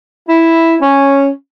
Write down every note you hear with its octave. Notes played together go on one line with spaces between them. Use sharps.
E4
C#4